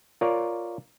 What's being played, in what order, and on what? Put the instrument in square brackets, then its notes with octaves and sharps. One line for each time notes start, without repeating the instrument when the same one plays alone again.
[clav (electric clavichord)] F4 A#4 C#5 D5